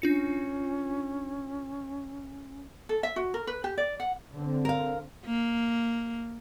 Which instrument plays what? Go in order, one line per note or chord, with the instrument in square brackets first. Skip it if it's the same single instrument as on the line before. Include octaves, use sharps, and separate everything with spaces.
[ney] C#4 [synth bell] D4 F4 C#7
[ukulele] A4
E5
F#4
A#4
B4
G4
D5
F#5
[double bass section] D3 C4
[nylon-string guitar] A#4 F5
[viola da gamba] A#3